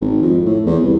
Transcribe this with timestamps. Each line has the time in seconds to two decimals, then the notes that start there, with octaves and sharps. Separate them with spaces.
0.01 G#1
0.22 F2
0.45 A2
0.66 E2
0.83 C2